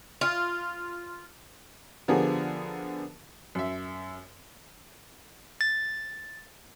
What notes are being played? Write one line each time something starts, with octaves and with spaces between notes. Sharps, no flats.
F4
D3 F3 B3 G4 G#4 A#4
F#2 E5
A6